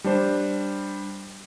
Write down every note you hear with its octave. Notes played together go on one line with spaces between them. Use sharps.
G3 D4 C5